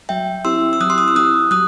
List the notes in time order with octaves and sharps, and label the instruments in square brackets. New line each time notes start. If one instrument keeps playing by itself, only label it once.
[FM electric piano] F#3 [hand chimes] E5 G5
[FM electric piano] C4 E4 G4 [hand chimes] C6 E6
[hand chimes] E6
[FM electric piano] F#3 [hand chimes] D#6 F#6
[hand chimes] C6
D#6
E6
[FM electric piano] C4 E4 G4 [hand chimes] D#6 F#6
[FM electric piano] F#3 [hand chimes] D#6 F#6